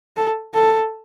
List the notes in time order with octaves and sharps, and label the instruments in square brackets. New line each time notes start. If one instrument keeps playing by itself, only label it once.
[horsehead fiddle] A4
A4